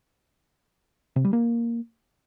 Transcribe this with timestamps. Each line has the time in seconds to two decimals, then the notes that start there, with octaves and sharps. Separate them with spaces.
1.16 C3
1.25 G3
1.33 A#3